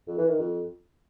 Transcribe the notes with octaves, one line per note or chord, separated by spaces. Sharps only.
F2
E3
D#3
F2